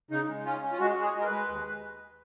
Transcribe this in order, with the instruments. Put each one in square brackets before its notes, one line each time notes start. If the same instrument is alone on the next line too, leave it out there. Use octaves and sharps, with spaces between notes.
[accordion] C#3 D#4
G#3
C#4 F4
C#4
F4
G#3 F#4
G#3 F#4
G#4
G#3
A#4
B4
G#3
D#2